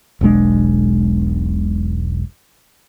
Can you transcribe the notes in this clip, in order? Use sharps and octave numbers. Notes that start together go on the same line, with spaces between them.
E1 B1 G#3 D4